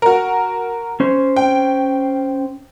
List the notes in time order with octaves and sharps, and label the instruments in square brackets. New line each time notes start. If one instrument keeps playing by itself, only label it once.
[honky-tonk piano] F#4 A#4
[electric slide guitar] C#4 C5
[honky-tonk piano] G5